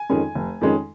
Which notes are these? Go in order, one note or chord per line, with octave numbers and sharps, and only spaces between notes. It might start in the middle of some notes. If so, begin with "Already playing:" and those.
Already playing: G#5
F2 D#3 G#3 C#4
F1
F2 D#3 G#3 C#4